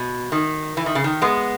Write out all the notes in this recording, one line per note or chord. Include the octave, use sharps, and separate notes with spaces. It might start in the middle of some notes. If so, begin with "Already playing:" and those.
Already playing: B2
D#3
E3
D#3
C#3
D#3
G#3 B3